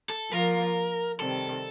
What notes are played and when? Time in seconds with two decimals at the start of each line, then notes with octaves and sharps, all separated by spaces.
0.10 A4
0.31 F3 A#3 F4 A#4
1.20 C3 D#3 G3 C4 A4